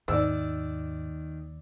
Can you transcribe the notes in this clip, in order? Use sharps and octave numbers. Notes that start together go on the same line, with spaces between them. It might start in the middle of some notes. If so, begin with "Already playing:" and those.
D#2 G#2 D#3 D5 E6